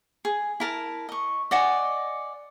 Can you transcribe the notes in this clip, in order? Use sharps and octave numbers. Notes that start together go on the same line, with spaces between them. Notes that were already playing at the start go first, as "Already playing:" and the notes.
G#4
E4 A#4 A5
D#5 C#6
D5 D#5 F#5 G#5